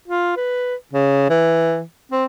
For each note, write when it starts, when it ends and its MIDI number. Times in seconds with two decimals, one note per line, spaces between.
0.08 0.34 65
0.37 0.75 71
0.93 1.27 49
1.30 1.81 52
2.12 2.25 60